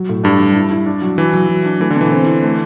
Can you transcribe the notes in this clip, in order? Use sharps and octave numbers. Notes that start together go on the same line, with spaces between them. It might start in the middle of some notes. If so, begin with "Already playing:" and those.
Already playing: F#3
A2
G2 D4
G3
E4
E4
D4
F#3
E3 F#3
F#3
F#3
D4
E3 A3
D3
B2
E3
C4
E4
A3